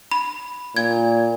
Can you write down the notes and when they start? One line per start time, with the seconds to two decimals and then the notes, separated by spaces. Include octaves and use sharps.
0.12 B5
0.76 A#2 G#6